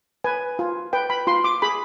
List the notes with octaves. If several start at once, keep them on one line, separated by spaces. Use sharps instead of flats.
B4 G#5
F4
B4 G5
B5
F4 C6
D6
G#4 B5